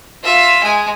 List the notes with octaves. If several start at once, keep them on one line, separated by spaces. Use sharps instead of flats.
F4 E5
G#3 G#5